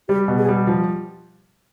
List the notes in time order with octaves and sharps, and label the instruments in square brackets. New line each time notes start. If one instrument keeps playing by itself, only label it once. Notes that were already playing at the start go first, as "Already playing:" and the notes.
[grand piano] G3 [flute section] G4
[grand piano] B2
[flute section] G#4
[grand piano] G3
F3